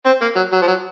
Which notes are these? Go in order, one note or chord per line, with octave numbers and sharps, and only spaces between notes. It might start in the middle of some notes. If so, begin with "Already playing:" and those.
C4
A#3
F#3
F#3
F3
F#3